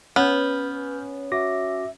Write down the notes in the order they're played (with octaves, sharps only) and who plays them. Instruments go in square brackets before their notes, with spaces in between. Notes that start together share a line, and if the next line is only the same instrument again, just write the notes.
[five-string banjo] B3 [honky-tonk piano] C#4 [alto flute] B4 [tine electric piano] F6 G6
[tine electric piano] F#4 D6 A#6 [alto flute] E5